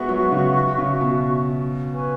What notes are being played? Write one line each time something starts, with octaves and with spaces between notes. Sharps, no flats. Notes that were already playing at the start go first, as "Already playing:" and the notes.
Already playing: G#3 B3 F#4 E5 C#6
F#3
C#3
C#3
B2
B4 G#5 C#6